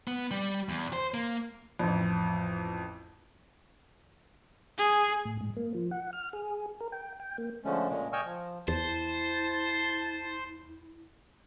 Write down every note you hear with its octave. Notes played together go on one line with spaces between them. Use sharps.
B3
G3
E2
C5
A#3
A1 F2
G#4
A2
G#2
A#3
F3
F#5
F6
G#4
A#4
G5
G5
A#3
D3 F3 G#3 A3 C#4
A#2 C#3 G#3
D#5 G5 G#5 C#6 E6 F6
F3
E2 E4 C5 A5